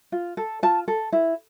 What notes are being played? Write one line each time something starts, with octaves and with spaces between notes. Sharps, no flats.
F4
A4
F4 A5
A4
E4